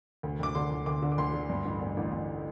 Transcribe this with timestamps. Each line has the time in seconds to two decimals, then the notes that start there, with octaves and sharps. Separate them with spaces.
0.23 D2
0.39 D2 D6
0.55 D3 C6
0.71 D2
0.86 D2 D6
1.02 D3
1.12 D6
1.18 D2 C6
1.33 D3
1.50 G2
1.65 A1
1.81 G2
1.97 A1
2.13 A1